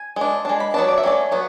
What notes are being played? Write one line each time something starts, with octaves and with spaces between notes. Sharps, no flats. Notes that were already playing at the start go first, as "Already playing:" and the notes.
Already playing: G#5
G#3 D4
G#3 D4 A5
B5
F#3 B3 D4 A5
D5
E5
F#3 A3 C#4 D5
F#3 B3 C#5